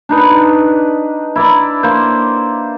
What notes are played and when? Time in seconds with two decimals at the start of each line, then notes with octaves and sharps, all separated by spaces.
0.09 D4 D#4 B4
1.36 E4 D5 A#5
1.83 A#3 C5